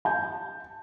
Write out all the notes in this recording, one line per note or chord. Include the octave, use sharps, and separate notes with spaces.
A5 G6